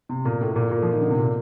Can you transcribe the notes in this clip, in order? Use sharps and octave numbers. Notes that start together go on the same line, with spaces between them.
C3
A#2
A2
A#2
A#2
F3
D#3
D3
C3
A#2